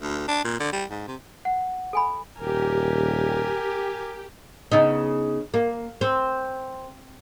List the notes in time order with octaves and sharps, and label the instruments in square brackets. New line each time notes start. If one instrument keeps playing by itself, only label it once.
[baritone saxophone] D2
D4
A#2
D3
G3
G#2
C3
[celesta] F#5
[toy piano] A4 G#5 B5
[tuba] D#1 [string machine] G4 [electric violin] A#4 G#5
[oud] C#3 B3 D#4
A#3
C4